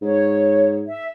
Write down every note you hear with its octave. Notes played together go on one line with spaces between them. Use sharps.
G#2 C#5
E5